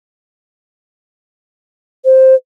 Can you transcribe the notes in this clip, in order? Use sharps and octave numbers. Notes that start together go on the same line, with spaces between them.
C5